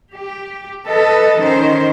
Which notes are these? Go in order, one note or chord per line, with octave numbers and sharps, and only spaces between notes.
G4
A4 B4 D#5
D#3 C#4 C5